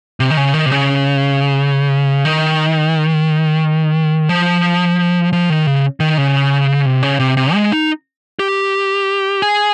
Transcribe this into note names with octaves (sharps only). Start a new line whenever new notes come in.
C3
D#3
C#3
D#3
C3
C#3
D#3
F3
F3
D#3
C#3
D#3
C#3
C3
C#3
C3
C3
G#3
D#4
G4
G#4